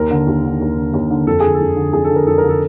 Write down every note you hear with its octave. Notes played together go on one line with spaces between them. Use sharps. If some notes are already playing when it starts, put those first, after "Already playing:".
Already playing: D#2 A#4
D3
D#2
D3
D#2
D3
D#2
D3
F2 A4
D3 G#4
A4
F2
D3
F2 G#4
A4
D3
A#4
F2 A4
A#4
D3
A4